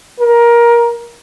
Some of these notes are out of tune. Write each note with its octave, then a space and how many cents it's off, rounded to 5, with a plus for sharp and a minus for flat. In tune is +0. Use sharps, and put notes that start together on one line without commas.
A#4 +20